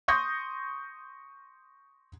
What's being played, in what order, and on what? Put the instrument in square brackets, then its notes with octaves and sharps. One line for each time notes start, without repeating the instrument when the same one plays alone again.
[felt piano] C6 C#6 D#6 G6 A#6